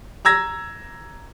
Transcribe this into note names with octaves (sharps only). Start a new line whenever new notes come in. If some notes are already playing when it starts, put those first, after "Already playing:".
A#5 E6 G#6 A#6